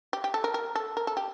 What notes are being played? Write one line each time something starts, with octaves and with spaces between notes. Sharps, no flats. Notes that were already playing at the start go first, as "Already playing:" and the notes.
G4
G4
A4
A#4
A#4
A4
A#4
A4
G4